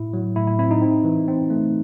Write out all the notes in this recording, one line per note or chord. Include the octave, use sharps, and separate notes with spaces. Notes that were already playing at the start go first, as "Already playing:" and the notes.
Already playing: A2 E4
F#3
A2 E4
E4
C4 E4
D#4
C4
E3
C4
A3